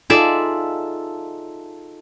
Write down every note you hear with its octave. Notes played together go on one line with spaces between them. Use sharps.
D#4 F4 G#4 A4 D5 E5